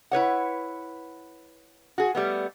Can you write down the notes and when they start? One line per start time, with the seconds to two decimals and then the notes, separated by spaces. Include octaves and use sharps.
0.11 E4 B4 C#5 F#5
1.98 F#4 G#4
2.15 G3 A3 B3